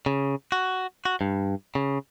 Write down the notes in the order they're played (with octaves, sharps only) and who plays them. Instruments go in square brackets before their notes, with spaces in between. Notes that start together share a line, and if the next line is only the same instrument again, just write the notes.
[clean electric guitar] C#3
F#4
F#4
G2
C#3